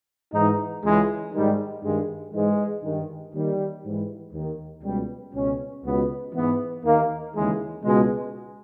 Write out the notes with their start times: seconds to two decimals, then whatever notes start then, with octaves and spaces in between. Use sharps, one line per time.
0.33 G#2 E3 D#4
0.83 C#2 C#3 E3 G#3
1.33 G#2 D#3 G3
1.83 G2 D#3 G#3
2.33 G#2 E3 G#3
2.83 G2 D#3
3.33 D#2 D#3 G3
3.84 G#2 E3
4.33 D#2 D#3
4.83 C#2 B2 G3
5.34 C#2 B2 C#4
5.84 C#2 B2 B3
6.34 G#2 E3 B3
6.84 D#2 D#3 A#3
7.34 D#2 C#3 E3 G#3
7.84 C#2 B2 G#3